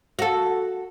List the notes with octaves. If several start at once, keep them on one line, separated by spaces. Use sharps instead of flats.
F#4 A4